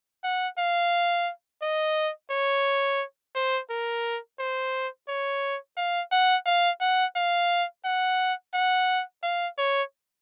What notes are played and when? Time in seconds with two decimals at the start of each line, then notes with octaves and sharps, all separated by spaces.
0.24 F#5
0.58 F5
1.62 D#5
2.31 C#5
3.35 C5
3.70 A#4
4.39 C5
5.08 C#5
5.77 F5
6.12 F#5
6.46 F5
6.81 F#5
7.16 F5
7.85 F#5
8.54 F#5
9.23 F5
9.58 C#5